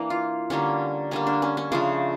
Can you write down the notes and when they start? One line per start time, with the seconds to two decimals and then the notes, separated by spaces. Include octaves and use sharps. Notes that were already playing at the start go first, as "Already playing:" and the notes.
Already playing: E3 A#3 D4
0.10 F4
0.50 D3 G3 A#3 C#4
1.11 D3 G3 A#3 C#4
1.27 D4
1.42 C#4
1.57 C#4
1.72 C#3 F3 A3 D4